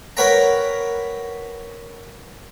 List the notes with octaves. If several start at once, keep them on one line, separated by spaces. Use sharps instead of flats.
A#4 B4 C#5 F#5 G5 A#5